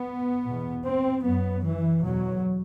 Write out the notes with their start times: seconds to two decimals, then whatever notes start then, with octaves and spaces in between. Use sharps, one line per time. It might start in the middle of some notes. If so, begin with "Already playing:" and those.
Already playing: B3
0.46 E2 B2
0.86 C4
1.25 F#2 B3
1.64 E3
2.04 E2 B2 F#3